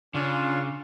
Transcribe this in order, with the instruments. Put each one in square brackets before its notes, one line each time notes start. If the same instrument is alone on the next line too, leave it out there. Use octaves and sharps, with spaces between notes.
[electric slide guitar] C#3 [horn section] C#4 D4 F4